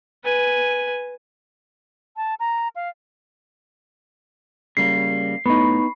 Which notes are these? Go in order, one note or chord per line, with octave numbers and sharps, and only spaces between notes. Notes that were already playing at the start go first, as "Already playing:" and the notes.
B4 G#5
A5
A#5
F5
C#3 G3 A#3 C7
A2 B3 D#4 B5 C#6